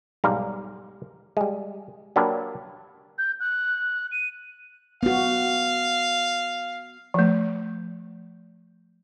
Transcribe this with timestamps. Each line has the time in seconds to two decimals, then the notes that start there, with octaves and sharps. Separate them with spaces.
0.24 B1 G#2 G3 F5 A#5
1.37 G3 G#3
2.16 F#3 A#3 D4 G4 B4
3.18 G6
3.40 F#6
4.12 D#7
5.03 B3 F#4 F5
7.14 F3 A3